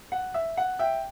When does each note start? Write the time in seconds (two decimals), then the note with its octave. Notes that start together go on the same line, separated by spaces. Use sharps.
0.12 F#5
0.34 E5
0.57 F#5
0.79 E5 G5